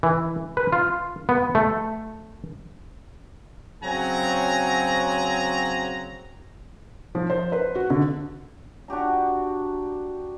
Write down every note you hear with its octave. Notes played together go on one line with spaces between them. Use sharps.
E3
B4
F4
B3
A3
C#3 F#3 C4 F#5 G#5 A#5
F3
C5
B4
F#4
D3
D4 F#4 G4 A#5